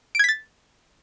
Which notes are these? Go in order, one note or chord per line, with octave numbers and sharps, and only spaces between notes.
G#6 A6 B6 D7